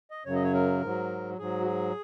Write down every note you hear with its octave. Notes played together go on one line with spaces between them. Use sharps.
D#5
F#2 C#3 F#3 C#5
D#5
C#5
A#4
G#2 F#3
G#2 F#3 G#4
F#4
G#4